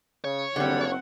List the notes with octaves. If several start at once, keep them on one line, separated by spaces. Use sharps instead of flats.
C#3 C#5
F#1 D3 G3 C4 F#5